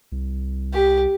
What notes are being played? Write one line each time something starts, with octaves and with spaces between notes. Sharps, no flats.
C2
G4